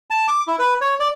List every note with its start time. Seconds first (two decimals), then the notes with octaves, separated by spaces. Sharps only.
0.10 A5
0.28 D6
0.48 E4
0.59 B4
0.81 C#5
1.00 D5